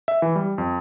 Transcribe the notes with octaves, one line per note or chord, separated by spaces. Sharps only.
E5
E3
G3
F2